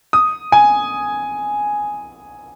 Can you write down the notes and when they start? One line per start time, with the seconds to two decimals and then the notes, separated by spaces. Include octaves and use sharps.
0.13 D#6
0.52 G#5